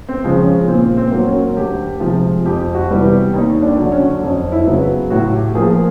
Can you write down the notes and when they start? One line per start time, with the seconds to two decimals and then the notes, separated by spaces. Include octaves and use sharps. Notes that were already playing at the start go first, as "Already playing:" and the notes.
0.08 C4
0.24 C#3 F3 G#3
0.38 C#4
0.67 A#2 C4
0.97 C4
1.12 F#3 A#3
1.27 C#4
1.56 D2 G4
2.00 C3 F3 G#3
2.45 F2 G4
2.74 F#4
2.90 C3 E3 G3 B3
3.04 G4
3.33 D#2 D#4
3.62 D4
3.78 D3 F#3
3.92 C#4
4.22 F2 C#4
4.52 E4
4.66 C#3 F#3 B3
5.10 A2 F#4
5.33 G4
5.55 F3 A#3 G#4